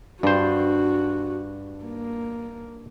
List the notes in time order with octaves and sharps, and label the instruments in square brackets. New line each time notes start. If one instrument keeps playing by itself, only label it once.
[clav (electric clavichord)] G2 C5 [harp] D4 [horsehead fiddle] F#4
[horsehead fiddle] A#3